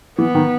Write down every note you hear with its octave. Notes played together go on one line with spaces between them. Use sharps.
E3 B3
D#3